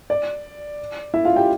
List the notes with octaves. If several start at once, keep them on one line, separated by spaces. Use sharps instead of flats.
D5
E4 E5
F4 F5
G4 G5